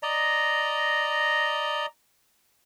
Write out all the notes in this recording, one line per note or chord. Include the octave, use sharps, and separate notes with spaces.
D5 D#5 A#5